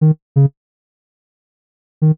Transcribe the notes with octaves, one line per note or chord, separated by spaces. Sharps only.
D#3
C#3
D#3